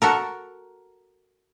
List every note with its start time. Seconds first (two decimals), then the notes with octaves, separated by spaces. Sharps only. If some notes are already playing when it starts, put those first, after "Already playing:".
0.02 F#4 A4 A#4